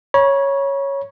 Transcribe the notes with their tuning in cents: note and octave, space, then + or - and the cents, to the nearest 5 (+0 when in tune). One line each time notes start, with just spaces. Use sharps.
C#5 +0 B5 -45